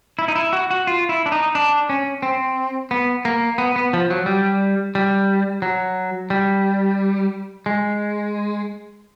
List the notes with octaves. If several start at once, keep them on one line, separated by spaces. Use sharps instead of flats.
E4
D#4
E4
F#4
F#4
F4
E4
D4
D#4
D4
C#4
C4
B3
A#3
B3
B3
F3
F#3
G3
G3
F#3
G3
G#3